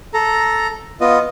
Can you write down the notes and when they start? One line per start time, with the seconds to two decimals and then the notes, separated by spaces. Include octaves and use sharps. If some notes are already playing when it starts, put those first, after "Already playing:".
0.14 A4 A#5
1.01 B3 F4 D#5